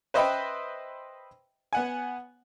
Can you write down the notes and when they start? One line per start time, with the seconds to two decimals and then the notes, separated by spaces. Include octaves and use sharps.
0.14 B4 C5 D#5 E5 G5 B5
1.73 B3 F#5 G#5